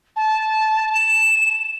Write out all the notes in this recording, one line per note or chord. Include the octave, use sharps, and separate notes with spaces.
A5
E7